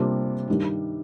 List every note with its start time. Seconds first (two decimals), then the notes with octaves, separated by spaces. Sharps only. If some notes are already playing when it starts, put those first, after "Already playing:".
Already playing: C3 G3 A#3 D4 F4
0.48 G2 D#3 G3 D4